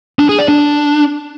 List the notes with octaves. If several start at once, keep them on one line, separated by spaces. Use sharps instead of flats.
D4
G#4
D5
D4